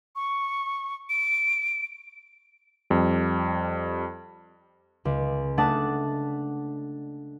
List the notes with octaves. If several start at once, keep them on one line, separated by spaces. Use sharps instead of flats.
C#6
D7
F2 G3
C#2
A3 D4 F#5 A5 D#6